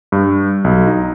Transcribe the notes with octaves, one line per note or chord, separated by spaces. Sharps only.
G2
B1
D#4